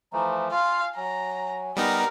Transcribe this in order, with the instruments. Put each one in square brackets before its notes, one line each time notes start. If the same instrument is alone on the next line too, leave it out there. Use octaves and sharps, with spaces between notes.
[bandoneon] E3 F3 A3 [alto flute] A#5
[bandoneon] F4 [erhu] F5 [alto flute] G#5
[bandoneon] F#3 [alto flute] G#5 [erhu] A#5
[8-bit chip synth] G3 B3 D#4 [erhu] A#4